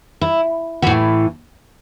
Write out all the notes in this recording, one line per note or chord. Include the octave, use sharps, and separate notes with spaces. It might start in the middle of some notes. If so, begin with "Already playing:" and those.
E4
A2 E3 F#4